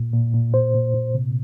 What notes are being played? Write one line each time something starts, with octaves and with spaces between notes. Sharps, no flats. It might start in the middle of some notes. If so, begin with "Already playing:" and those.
Already playing: A#2
A#2
A#2
A#2 C5
A#2
A#2
C3